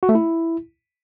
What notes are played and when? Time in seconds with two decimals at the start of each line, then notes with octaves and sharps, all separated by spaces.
0.03 F#4
0.09 A3
0.15 E4